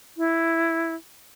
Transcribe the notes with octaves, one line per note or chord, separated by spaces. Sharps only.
E4